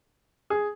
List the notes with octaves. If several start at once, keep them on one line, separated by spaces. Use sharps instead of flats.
G#4